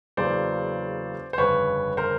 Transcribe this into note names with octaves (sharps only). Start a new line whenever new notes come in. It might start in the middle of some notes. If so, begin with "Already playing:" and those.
E2 C#3 F#3 A#3 C5 D5
C5
G1 F2 C#3 B4 C#5
A#4 C5